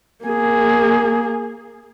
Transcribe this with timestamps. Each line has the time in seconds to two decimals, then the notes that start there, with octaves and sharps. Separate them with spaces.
0.25 A#3 G#4